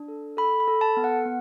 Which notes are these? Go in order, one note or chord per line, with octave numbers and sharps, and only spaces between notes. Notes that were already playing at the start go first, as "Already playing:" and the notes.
Already playing: D4
A4
A4 B5
B5
A4
A5
B3
F#5
B3